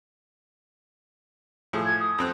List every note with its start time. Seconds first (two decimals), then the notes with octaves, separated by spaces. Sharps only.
1.73 A2 F3 G#4
1.85 G#6
2.00 D#6
2.18 F2 C4 F#6